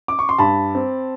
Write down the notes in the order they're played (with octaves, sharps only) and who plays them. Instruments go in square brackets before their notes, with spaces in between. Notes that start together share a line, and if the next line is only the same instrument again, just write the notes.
[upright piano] D6
C#6
C6
G2 A5 B5
C4